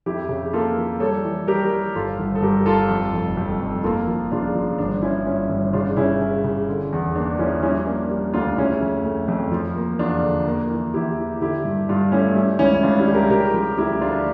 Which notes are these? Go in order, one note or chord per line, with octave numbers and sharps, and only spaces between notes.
F2 E4 G4
C#3
A#3 F4 A4
F3
G3 A4 C#5
E3
G3 G4 A#4
G3
G1 F4 A4
G1
A4
G2 G4 A#4
G1 F4 A4
F2
F1
F2
F2
A#3 F4 A4
F3
C#3 D4 F4
F3
G1 D4
F3 C#4 E4
G2 C#4 E4
G1
C#3 D4 F4
C#3 C#4 E4
C#3
C#3
D3
E2
A#3 D4
F3 C#4 E4
G3 C#4 E4
A#3 D4
G3
D2 D4 F4
C#3 C#4 E4
F2
A3
F2
F3
A#3
E2 D4 F4
D3
A#3
E3
E2 E4 G4
E3
D3 E4 G4
G2
G2 D4 F4
A3 C#4 E4
G3 C#4 E4
C#2 C#4 E4
C#2 D4 F4
E4 G4
G3
G4 A#4
C#3 G4 A#4
F3
D2 E4 G4
D2 D4 F4